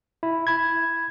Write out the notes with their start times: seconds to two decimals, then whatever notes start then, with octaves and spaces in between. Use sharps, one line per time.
0.23 E4
0.47 B5 G#6